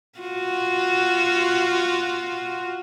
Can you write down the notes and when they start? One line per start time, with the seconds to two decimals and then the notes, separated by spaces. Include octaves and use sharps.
0.19 F4 F#4